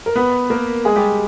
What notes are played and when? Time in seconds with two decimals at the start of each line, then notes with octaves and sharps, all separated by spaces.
0.06 A#4
0.16 B3 B4
0.50 A#3 A#4
0.85 G#3 G#4
0.96 G3 G4